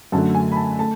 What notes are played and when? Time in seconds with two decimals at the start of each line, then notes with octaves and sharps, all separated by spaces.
0.12 F#2 D3 F#3 A3 A5
0.35 G#5
0.52 B5
0.57 A5
0.79 A3 A5